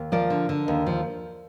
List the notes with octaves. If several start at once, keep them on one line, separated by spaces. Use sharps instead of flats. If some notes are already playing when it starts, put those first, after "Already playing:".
Already playing: D#2
F3 A#4 D5
D3
D3
D#2
F3